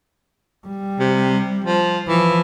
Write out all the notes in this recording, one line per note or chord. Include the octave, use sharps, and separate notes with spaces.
G3
C3
F3
E3 F3